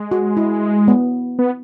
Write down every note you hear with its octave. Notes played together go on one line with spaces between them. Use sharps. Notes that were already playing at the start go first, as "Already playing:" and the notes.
Already playing: G#3
F#4
E4
B3
B3